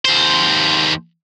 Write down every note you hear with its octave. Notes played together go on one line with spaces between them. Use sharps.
D#2 C5